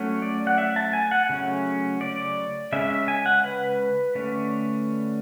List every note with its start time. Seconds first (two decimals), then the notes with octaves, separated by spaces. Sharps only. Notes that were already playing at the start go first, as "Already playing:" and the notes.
Already playing: F#3 A3 C#4
0.22 D5
0.47 F#5
0.58 E5
0.76 A5
0.93 G#5
1.11 F#5
1.29 C#3 F#3 A3 C#4
2.01 D5
2.72 C#3 G#3 C#4 E5
2.90 E5
3.08 G#5
3.26 F#5
3.44 B4
4.15 D3 A3 C#4